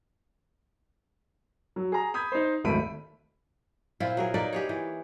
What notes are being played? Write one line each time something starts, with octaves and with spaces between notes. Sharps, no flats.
F#3
G#4 A#5
B5 D#6 G6 G#6
D#4 C5
D1 G#1 A3 B5 D7 D#7
A#2 C4 E4 F4
F#3 G#4 A#4
A#3 D#4 B4 D5
G4 G#4 C#5
E3